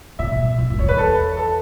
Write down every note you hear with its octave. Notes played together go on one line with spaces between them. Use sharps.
C#3 E5
B2
F#2
F#2
E2 C#5
B4
A4
A4